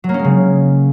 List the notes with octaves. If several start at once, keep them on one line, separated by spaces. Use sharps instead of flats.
F#3
A#3
C#4
G#3
C#3